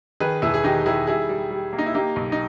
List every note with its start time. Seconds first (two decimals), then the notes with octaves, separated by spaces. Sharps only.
0.20 D#3 G#4 B4
0.42 E1 E4 G#4
0.54 G#4
0.64 D#3 D#4 G4
0.86 D#3 E4 G#4
1.07 G3 E4 G#4
1.29 G3
1.51 G3
1.73 A#3
1.79 D#4
1.86 E4
1.94 A#3 D#4 G4
2.16 B1
2.32 D#4